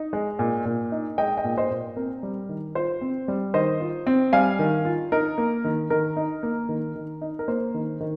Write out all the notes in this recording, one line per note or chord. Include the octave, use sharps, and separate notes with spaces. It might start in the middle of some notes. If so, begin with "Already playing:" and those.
Already playing: D#4
G#3
A#2
A#2
D#4
G#3 D#5 G5
D#5 G5
A#2
C5 D#5
A#2
C4 A#4
G3
D#3
F4 C5
C4
G3
D#3 C5 D#5
F4
C4
G3 F5 G#5
D#3
F4
D#4 A#4
A#3
D#3
D#3 A#4
D#4
A#3
D#3
D#3
D#4
A#4
A#3 C5
D#3
D#3